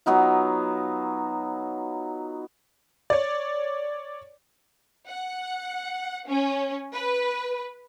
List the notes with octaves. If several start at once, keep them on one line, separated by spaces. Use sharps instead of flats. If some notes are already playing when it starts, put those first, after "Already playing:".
F#3 B3 D#4 F4
C#5 D5
F#5
C#4
B4